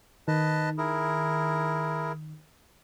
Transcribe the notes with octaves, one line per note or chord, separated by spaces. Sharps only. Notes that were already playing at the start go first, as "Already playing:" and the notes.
D#3 B4 D#5 A5
E4 G#4 A#4